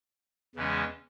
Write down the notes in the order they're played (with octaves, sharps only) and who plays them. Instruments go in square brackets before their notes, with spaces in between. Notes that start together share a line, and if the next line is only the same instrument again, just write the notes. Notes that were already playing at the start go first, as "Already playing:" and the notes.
[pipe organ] E2 C#3 E3 G#3 C#4